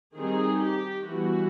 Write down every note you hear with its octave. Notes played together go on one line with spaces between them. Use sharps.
D#3 G3 C4 D#4 G#4
G4
E3 G3 B3 F#4